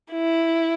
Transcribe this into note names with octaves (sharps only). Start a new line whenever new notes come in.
E4